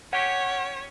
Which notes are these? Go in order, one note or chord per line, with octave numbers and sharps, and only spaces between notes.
C#4 G4 C#5 F#5